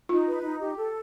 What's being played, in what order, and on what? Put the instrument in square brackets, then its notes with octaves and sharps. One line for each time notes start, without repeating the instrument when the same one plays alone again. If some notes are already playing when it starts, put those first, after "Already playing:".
[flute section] D#4 [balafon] F4
[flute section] B4
D#4
G4
A4